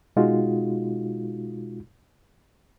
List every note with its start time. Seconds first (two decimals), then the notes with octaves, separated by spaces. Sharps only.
0.16 B2 G#3 D#4 F4 F#4